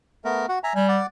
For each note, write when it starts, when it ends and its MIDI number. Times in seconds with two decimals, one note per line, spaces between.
0.25 0.46 57
0.25 0.46 59
0.25 0.46 70
0.49 0.59 66
0.49 0.59 78
0.64 0.73 76
0.64 0.73 80
0.64 0.73 82
0.76 0.99 55
0.76 0.87 80
0.89 1.06 74
0.89 1.06 78
0.89 1.06 86